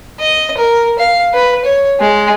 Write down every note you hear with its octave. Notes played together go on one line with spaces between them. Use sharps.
D#5
A#4
F5
B4
C#5
G#3